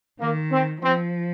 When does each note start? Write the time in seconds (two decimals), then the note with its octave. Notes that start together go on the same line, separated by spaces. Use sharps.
0.20 D#3 A#3
0.52 C4
0.83 F3 C4